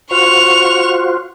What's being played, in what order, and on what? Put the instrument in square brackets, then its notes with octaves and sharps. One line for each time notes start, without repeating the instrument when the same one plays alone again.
[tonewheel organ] F4 F#4 C5 [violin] C#6 F7